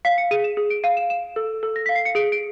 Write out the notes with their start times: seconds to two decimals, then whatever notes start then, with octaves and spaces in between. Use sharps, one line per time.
0.05 F5 B6
0.18 C#7
0.31 G#4 D#7
0.44 E7
0.57 G#4
0.70 D7
0.84 F5 D#7
0.97 E7
1.10 F5 E7
1.36 A4
1.63 A4
1.76 A#6
1.86 F5 B6
1.95 C7
2.05 C#7
2.15 G#4 D7
2.32 D7